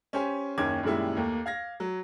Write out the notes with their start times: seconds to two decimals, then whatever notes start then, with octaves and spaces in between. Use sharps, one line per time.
0.13 C#4 G4 C5 G#5
0.58 F#1 D#2 D#3 C#4 D6 G#6
0.83 F#2 A#2 D#3 G3 G#3 E4
1.16 D#2 A3 A#3
1.46 F5 G#6 A#6
1.80 F#3